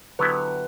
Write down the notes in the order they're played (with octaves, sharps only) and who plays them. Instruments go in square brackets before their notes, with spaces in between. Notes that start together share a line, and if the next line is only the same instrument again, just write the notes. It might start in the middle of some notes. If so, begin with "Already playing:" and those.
[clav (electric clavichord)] D3 F#3 B3 E4 G4 [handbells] B4